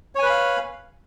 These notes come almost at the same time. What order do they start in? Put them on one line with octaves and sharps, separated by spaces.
C#5 G#5 B4 B5 F5